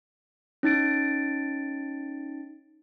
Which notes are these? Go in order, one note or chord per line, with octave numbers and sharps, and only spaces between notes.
C#4 D#4 A6 D7